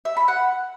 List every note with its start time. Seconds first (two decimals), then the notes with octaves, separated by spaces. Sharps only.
0.05 E5
0.17 B5
0.28 F#5